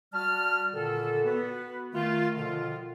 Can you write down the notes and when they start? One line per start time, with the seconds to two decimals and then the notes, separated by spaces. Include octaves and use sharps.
0.13 G3 F#4 A5 F6
0.73 A#2 D3 D#3 A4
1.24 B3 F#4 B4
1.93 D#3 A3 F4
2.36 B2 D3 D#3 F3 F4